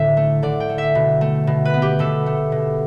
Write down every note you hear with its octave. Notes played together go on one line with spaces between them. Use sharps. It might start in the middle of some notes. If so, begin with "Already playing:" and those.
Already playing: A2 D3 E5
A3
D3 D5
G5
A3
E5
B2
A3
B2
B4
B3
G4
B2 A4
A3
B2